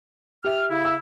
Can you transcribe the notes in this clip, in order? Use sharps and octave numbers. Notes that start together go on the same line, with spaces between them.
G4 E5 F6
C#3 E4
E6